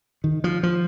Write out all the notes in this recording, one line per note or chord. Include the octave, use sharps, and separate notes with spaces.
D#3
F3
F3